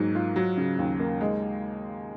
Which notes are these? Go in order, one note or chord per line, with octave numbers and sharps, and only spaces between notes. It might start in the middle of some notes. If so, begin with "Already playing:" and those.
Already playing: G#2 F#3 A#3
F4
F#3
C#3
D#2
A#3
G#3